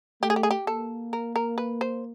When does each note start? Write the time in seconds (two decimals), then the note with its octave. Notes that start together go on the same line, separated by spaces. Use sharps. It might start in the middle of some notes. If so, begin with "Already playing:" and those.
0.22 A3 G4
0.30 G#4
0.36 G4
0.43 G#4
0.51 G4
0.67 A#3 A4
1.13 A#4
1.36 A#4
1.58 B4
1.81 C5